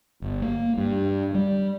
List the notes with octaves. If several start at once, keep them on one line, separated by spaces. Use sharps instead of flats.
G1
A#3
G2
G3